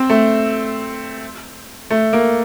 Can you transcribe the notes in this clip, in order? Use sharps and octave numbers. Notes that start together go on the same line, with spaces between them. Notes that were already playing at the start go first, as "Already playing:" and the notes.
Already playing: C4
A3
A3
A#3